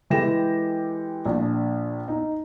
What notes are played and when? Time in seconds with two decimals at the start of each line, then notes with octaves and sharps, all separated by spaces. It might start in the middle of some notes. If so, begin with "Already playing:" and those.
0.10 E3 G#3 G4 A4 A#6 E7
1.25 A#1 D4
2.08 D#4